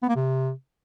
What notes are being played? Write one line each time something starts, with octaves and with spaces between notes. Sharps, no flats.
B3
A#3
C3